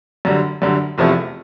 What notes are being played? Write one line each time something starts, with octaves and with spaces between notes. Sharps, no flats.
F#2 D3 G3
F#2 D3 G3
F1 E2 C3 F3 A3